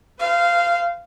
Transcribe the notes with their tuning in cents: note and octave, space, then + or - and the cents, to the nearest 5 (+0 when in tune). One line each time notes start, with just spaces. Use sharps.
C5 -45 F5 -15